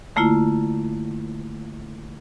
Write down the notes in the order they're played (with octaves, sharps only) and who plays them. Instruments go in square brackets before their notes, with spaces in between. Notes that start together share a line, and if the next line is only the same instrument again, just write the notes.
[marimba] D3 A3 A#3 E4 F4